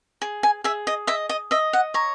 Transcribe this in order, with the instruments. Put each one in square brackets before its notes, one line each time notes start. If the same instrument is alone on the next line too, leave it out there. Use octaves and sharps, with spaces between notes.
[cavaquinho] G#4
G#5
G#4 E5
D#5
D#5 E5
D#5
D#5 E5
F#5
C#5 A#5